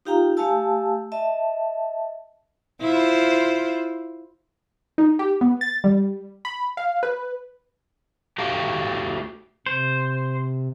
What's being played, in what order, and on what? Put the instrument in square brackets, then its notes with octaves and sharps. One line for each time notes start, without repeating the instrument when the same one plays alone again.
[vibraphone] D#4 F4 G4 F5 G5 A#5
A3 G4 F5 G#5 A5 E6
D#5 E5 A5
[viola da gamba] E4 F4 C5
[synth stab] D#4
G4
B3
A6
G3
B5
F5
B4
[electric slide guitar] A3 F#4 G4 F5 G5
[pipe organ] C3 [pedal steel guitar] C5